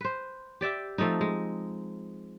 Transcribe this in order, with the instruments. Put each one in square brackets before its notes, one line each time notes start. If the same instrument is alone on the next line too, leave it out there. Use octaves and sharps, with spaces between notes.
[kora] B4 C5
G4 D5 E5 G5
F3 A3 C4 D#4
G#3